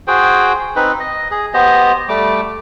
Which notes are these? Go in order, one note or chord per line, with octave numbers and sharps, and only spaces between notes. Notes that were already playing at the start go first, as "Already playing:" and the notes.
F#4 G#4 C5 G5
C4 D#4 B4
D#5
G#4
B3 G4 C5 D#5
G3 A3 D6